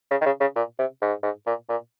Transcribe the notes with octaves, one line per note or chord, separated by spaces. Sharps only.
C#3
D#3
C#3
C#3
A#2
C3
G#2
G#2
A#2
A#2